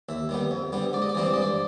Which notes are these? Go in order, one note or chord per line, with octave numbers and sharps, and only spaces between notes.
D#2 E5
D#3 G3 B3
F2
D3 G3 B3
G#2 D5
D#5
D5
E3 G3 C4 D#5
D5
G2 D#5
D5